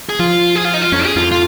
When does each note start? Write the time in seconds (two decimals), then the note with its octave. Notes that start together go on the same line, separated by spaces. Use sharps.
0.09 G#4
0.19 F3 F4
0.56 G#4
0.65 F4
0.74 D#4
0.82 F4
0.92 F2 C#4
1.05 G#4
1.16 F2 F4
1.31 F4